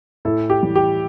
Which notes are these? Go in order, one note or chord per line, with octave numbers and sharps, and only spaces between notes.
A2 E4 A4
G4
E3 G3
G4